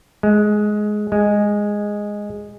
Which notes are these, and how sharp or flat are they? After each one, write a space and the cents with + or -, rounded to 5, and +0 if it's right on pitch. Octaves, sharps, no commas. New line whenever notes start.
G#3 +15
G#3 -5